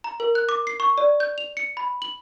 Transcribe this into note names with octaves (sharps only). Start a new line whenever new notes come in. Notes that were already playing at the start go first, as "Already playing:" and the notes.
A#5
A#4
F#6
D6
C7
C#6
D5
G6
F7
C#7
B5
F#7